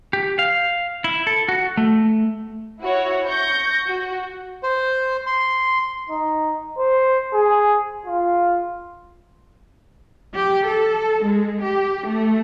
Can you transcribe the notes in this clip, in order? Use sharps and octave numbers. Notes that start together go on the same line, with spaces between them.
G4
F5
E4
A4
F#4
A3
E4 F#4 C#5
C#6 G6 A#6
F#4
C5
C6
D#4
C5
G#4
F4
G4
A4
G#3
G4
A3